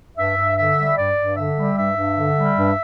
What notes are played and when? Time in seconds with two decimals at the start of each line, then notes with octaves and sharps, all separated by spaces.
0.17 G2 E5
0.37 G2
0.57 D3 E5
0.77 G3
0.97 G2 D5
1.17 G2
1.36 D3 E5
1.57 G3
1.77 G2 E5
1.97 G2
2.17 D3
2.37 G3
2.57 G2